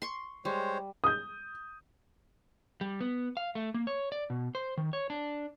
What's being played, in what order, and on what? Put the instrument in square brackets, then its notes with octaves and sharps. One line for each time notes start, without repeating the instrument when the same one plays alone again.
[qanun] C6 C#6
[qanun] G3 [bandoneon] G#3 C5 C#5
[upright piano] D#6 G6
[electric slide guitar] G3
B3
F5
A3
A#3
C#5
D5
B2
C5
D#3
C#5
D4